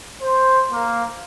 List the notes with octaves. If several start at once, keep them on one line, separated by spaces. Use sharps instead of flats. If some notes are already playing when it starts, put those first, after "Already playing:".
C5
A#3